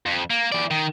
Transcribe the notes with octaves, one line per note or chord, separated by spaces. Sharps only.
F2
A#3
E3 D5
D#3